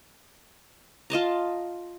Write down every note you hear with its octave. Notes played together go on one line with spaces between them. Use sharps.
F4 D#5 A5 A#5